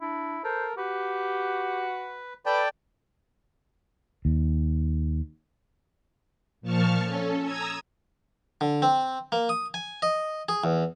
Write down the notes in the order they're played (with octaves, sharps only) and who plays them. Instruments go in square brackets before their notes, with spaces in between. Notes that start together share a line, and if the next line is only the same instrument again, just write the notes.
[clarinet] D4 [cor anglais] E4
[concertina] A4 [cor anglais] A#4 [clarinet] C5
[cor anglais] F#4 [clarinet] G4 [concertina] B4
[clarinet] A4 [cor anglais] B4 [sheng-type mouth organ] D5 G5 [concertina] A5 D6
[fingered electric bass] D#2
[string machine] A#2 F3 A5 C#6 F6
C#4 A4
A#5 D#6 E6 G#6
[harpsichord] D3
C4
A#3
D#6
G#5
D#5
G#4
E2